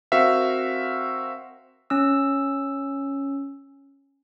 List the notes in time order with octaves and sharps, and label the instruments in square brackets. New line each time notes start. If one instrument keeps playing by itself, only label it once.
[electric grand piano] C4 F#4 A#4 C5 E5 F5
[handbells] C#4 E6